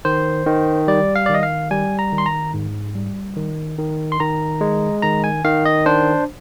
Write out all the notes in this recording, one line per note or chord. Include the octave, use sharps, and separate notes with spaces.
D#3 C5
D#3
G3 D5
F5
D5
D#3 D#5
F5
G3 G#5
A#5
D#3
C6
A#5
G#2
G3
D#3
D#3
C6
D#3 A#5
G#3
D#3 A#5
G#5
D#3 F5
D#5
D4 C5